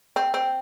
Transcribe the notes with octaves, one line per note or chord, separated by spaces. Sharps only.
C4
C4